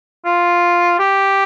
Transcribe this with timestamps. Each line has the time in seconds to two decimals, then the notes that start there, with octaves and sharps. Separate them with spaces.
0.25 F4
0.99 G4